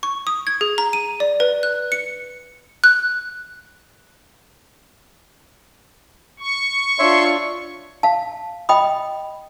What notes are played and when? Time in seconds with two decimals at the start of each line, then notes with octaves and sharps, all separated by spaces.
0.03 C#6
0.27 D#6
0.47 G#6
0.61 G#4
0.78 A#5
0.93 D#7
1.20 D5
1.40 B4
1.63 F#6
1.92 C#7
2.84 F#6
6.40 C#6
6.99 D4 F4 C#5 E5 C6
8.03 F5 A5
8.69 D#5 G5 B5 D#6